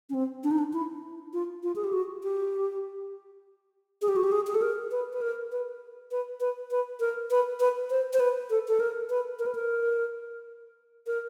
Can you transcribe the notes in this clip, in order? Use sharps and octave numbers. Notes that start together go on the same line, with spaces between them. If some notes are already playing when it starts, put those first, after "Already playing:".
C#4
C4
D4
D#4
D4
E4
F4
F4
G#4
G4
F#4
G4
G#4
G4
F#4
G4
G#4
G#4
A4
A#4
B4
B4
A#4
B4
B4
B4
B4
A#4
B4
B4
C5
C5
B4
A4
A4
A#4
B4
A#4
B4
A#4
A#4